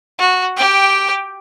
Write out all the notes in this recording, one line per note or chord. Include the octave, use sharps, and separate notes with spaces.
F#4
G4 G5